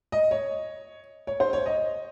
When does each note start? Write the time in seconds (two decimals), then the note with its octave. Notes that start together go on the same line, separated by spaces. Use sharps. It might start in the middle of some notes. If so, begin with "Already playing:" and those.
0.12 D#5
0.31 C#5
1.27 C#5
1.40 C5
1.53 C#5
1.66 D#5